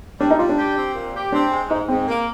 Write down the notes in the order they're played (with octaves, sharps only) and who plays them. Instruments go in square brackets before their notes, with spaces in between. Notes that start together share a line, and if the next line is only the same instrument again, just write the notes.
[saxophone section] G3 [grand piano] D4
[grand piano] D#4
[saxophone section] G3 [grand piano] F4
[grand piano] D4
[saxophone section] G4
C4
A#2
G4
[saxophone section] C4 [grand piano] D4
[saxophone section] G#3
[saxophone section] G#2 [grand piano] D#4
[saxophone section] G#2 [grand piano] C4
[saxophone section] A#3